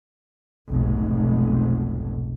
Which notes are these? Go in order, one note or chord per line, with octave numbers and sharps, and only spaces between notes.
F1 B1 G#2